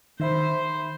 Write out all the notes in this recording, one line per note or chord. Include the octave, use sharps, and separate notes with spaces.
D#3 C5 E5 B5